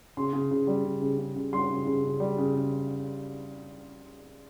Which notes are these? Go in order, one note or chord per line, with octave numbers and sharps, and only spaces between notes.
C#3 C6
C#3
C#3
G3
C#3
C#3
C#3
C#3
G3 C6
C#3
C#3
C#3
G3
C#3
C#3